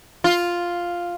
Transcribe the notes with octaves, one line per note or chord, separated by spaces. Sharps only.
F4